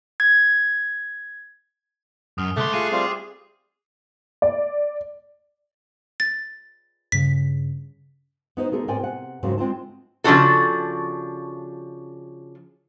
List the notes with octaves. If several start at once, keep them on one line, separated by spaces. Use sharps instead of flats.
G#6
F#2 D#6 F6
C2 G#2 A3 C6 D6 F#6
F4 G#4 C#6 F#6 C7 D#7
G3 C4 F4
D5
A6
G2 C#3 B6
B3 D#4 C5
D3 A3 G#4 A#4
A2 C4 A#4 D5 G5 G#5
C3 F#5
F2 G#2 C#3 F#3 A#3
G#3 C4 F4 A5
C#3 F3 D4 E4 F#4 A4